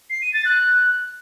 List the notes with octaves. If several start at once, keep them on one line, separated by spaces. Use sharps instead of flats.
C7
D#7
A6
F#6